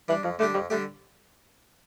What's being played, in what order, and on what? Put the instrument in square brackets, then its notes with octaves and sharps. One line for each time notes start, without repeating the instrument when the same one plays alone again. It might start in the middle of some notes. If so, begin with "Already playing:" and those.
[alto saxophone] E3 [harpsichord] G3 D4
[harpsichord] F2 [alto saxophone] F3
[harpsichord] D3 G3 D4 G4 [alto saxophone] A3
[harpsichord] F2 [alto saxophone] G3
[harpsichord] D3 G3 D4 G4 [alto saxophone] A3